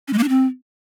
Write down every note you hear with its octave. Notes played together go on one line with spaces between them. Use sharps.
C#4
G#3
A#3
D4
C4